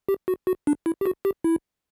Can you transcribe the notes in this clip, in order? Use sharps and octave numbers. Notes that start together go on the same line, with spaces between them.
G4
F#4
F#4
D4
E4
G4
F#4
G4
E4